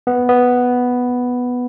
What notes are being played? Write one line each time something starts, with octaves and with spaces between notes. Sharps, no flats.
B3
B3